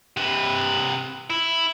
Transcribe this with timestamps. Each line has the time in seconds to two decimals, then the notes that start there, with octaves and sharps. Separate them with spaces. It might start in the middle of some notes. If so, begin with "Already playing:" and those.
0.17 C3 B4
1.30 E4